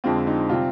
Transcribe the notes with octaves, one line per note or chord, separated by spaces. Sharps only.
F2 D3 G#3 C4 F4
D#4
C3 G3 C4 F4